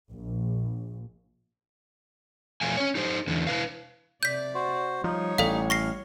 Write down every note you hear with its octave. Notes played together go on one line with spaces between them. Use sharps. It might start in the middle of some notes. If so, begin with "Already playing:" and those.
A#1
B2 F3 A3 F5 G#5
C#4 C#5
D#4 G4 C5
E2 D3
E4 B4 F5
C3 D5 G6 B6
F#4 C5
F3 G3 D#4 C#5
A1 A4 D5 F5
C#6 F6 A#6 C7